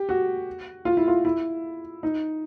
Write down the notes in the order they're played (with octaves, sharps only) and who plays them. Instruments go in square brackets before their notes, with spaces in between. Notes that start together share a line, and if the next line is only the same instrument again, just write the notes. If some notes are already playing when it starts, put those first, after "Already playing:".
Already playing: [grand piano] G4
F#4
F4
E4
F4
E4
D#4